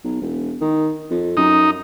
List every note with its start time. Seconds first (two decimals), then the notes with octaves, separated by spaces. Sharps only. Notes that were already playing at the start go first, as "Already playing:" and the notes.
0.04 B1
0.22 E1
0.61 D#3
1.10 F2
1.37 F#2 D#4